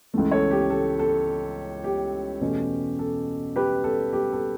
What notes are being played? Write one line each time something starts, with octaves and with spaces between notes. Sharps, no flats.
C#2 C#3 E3 A3
A4 C#5
G4
A4
A4
G4
E2 B2 A3 C#4
A4
G4 B4
A4
G4
A4